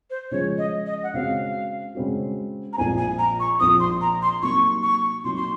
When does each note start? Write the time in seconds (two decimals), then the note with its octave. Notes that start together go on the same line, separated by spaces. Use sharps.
0.10 C5
0.31 C#3 F3 G#3 C#4 G#4 C#5
0.58 D#5
0.86 D#5
1.03 F#5
1.14 C#3 G#3 C4 F#4 F5
1.95 C#3 G#3 C4 F#4
2.73 A#5
2.78 A#1 A#2 F3 C4 F4 G#5
2.98 G#5
3.19 A#5
3.40 C#6
3.59 A#1 A#2 F3 C4 F4 D#6
3.80 C6
4.01 A#5
4.22 C6
4.42 C3 F#3 A#3 D#4 C#6
4.83 C#6
5.24 C3 F#3 A#3 D#4 C6
5.36 C6